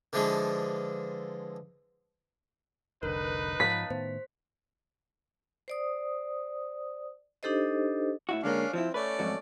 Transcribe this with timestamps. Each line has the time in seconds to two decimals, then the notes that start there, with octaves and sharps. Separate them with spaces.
0.13 D3 E3 F3 G#3 D4
3.03 F1 C2 D3 D#4 A#4 B4
3.60 G#2 F3 F5 A5 A6 B6
3.90 A2 D#3 B3 C5
5.68 C5 D5 D#6
7.43 D4 D#4 G4 A4 C5 D#5
8.29 A2 E4 F#4
8.43 D3 G#3 A#3 C#4 D4 F5
8.73 F3 C4 E4
8.94 A3 C#4 B4 D5
9.19 F2 G#2 F#3